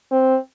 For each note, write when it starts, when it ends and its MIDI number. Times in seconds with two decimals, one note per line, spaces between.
0.11 0.37 60